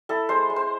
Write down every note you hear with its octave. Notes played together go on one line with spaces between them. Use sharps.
E4 A4
G#3 C5
G#3
C5